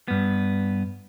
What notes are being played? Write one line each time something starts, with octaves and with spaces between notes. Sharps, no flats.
G2 B3